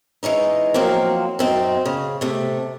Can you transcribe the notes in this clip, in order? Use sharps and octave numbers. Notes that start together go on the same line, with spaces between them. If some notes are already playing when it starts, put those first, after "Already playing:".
E3 G#3 C#4 D#4
F3 F#3 A#3 C4
F#2 C4 D#4
C#3
C3 A3